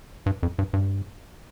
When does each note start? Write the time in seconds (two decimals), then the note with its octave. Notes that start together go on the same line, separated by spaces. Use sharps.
0.26 G2
0.43 F2
0.59 G2
0.73 G2